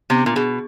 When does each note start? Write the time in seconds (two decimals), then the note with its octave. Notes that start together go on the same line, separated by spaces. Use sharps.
0.10 C3 B3
0.26 A#2
0.36 B2 G#4